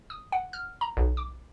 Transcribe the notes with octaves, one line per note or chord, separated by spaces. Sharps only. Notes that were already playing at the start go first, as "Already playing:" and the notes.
D#6
F#5
F6
A#5
B1
D6